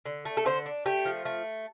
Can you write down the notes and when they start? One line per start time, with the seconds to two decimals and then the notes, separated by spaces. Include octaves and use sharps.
0.06 D3
0.25 A3
0.37 A4
0.46 D3 C5
0.66 D4
0.86 A3 G4
1.05 F3
1.25 A3